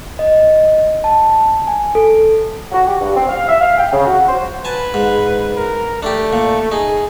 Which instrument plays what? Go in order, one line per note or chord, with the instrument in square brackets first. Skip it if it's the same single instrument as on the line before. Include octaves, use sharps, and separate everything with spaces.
[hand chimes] D#5
A5
G#5
A4
[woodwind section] F#4
G4
G2
C4
F5
E5
F5
G5
C#3
F#4
C5
[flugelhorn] B4 [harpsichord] G#5 A5
[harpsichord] G#2
[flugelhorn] A#4
[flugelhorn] A3 [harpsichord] D4 G4
[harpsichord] A#2
[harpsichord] D#4 [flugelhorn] G#4